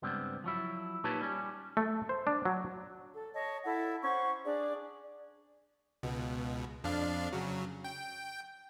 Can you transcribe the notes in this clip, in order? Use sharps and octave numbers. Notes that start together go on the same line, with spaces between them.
C#2 G2 G3 B3 C4
F3 F#3 E4
A#2 D#4 G4 B4 C#5 A5
G3 C#4
A3
C5
D4
F#3
A4
C#5 D#5 A5
E4 A4 F#5
C#4 C5 F#5 C#6
D4 G#4 D5
C#2 B2
F2 D4 F5
C#3 F#3
G5